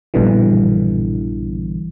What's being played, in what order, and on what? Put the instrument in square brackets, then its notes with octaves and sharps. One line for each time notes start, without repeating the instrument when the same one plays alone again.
[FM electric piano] A#1 G2 B2 D3 E3